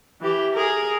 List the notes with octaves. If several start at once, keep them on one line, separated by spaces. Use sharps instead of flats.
E3 G4
G#4 A#4